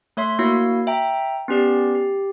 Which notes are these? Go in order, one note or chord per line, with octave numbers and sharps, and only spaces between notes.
A3 C#5 E5 C6 B6
A#3 E4 F#4 C#5 F5
E5 G5 A#5
B3 C#4 G4 D5
G4